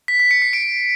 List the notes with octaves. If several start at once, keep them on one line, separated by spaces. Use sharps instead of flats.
B6
B6
C#7
C7
D7